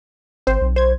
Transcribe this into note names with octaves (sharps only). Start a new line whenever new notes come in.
G#1 C4 C5
B1
C5 G#6